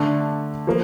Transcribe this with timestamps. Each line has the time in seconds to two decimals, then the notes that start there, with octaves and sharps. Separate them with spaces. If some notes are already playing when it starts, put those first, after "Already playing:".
Already playing: D3 A3 D4
0.67 F3 A#3